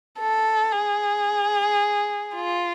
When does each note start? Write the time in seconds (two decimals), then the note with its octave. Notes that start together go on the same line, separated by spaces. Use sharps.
0.19 A4
0.73 G#4
2.35 F4